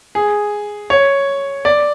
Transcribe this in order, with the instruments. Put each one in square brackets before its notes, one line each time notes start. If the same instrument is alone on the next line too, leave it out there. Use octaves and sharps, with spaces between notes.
[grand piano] G#4
C#5
D5